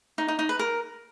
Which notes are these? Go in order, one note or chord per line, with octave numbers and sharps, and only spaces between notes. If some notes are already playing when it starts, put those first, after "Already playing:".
D#4
D#4
D#4
B4
A#4